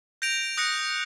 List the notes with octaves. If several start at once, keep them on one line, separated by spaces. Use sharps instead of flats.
G6 A#6 D7 F7
D#6 F#6 A#6 C#7